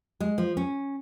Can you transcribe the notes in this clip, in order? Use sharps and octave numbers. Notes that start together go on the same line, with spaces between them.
G#3
F3
C#4